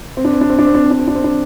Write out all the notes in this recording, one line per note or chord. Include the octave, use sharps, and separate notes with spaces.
C4
D4
C4
D4
C4
D4
C4
D4
C4
D4
C4
D4
C4
D4